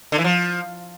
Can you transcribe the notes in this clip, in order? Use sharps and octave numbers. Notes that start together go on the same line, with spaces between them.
D3
E3
F3